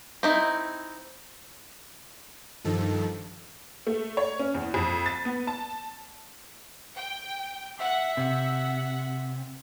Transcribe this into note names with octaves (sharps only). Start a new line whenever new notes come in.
C4 D#4 E4
G2 D#3 F3 A4
A3
C#5
C#4
E2
F2
A6
B3
A5
G5
E5 F#5
C3 F#5